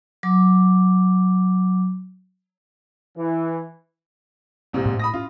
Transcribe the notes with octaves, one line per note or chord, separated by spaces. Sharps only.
F#3 D6
E3
A#1 G#2 C3
A2
B5 D#6 A#6
C#4 F4